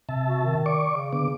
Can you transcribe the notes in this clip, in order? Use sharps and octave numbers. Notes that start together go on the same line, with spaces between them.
C3 E5 A5
F#4
D#3
D5 C#6 D6
C#3
D3 B3 D6